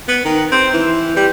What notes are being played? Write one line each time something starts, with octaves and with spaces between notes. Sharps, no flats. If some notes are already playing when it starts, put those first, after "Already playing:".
B3
D#3
C4
E3
G3